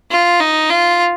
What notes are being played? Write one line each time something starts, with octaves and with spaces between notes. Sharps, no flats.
F4
D#4
F4